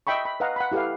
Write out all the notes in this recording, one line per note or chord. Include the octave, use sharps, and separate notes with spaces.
D#5 E5 G5 B5 C#6
B5
B4 D#5 F5 F#5 A#5
F#5 B5
E4 G4 A4 B4 F5